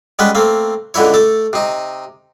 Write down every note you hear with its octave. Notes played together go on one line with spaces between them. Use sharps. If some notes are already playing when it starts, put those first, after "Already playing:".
G3 G#3 B3 C#4 B4
A3 A#3 C4
C#2 D3 E3 E4 C#5
A3 A4 D6
C3 D#4